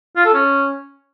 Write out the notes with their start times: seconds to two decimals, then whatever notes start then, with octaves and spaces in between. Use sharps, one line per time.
0.16 F4
0.25 A4
0.34 C#4